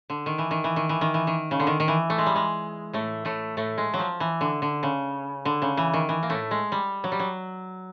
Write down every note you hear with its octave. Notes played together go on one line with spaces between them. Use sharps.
D3
D#3
E3
D#3
E3
D#3
E3
D#3
E3
D#3
C#3
D3
D#3
D#3
E3
A3
G#3
G3
G#3
A2 A3
A2 A3
A2 A3
G#3
F#3
F3
E3
D3
D3
C#3
D3
C#3
E3
D#3
E3
A#3
A2 A3
G#3
G3
F#3
G3
F#3